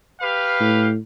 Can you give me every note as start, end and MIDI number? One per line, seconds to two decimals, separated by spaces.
0.21 0.90 67
0.21 0.90 71
0.21 0.90 77
0.60 0.98 45